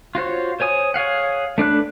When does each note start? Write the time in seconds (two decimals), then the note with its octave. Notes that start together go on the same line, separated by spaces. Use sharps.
0.15 F4 F#4 C5 C#5
0.60 C5 C#5 G#5 D#6
0.94 G#4 C#5 F5 F#5
1.58 A3 D4 B4 F#6